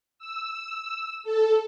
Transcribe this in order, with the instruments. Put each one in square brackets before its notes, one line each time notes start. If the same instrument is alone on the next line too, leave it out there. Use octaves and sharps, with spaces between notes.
[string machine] E6
A4